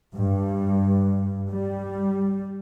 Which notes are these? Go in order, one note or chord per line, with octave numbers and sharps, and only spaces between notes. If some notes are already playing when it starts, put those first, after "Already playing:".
G2
G3